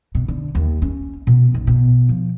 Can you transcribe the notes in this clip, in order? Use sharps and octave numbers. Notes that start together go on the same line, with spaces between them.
B2
D3
D#2
C#4
B2
B1
B2
F3